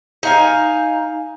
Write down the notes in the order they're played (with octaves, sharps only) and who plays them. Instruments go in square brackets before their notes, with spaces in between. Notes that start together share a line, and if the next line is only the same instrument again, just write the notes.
[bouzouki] D#4 F5 G#5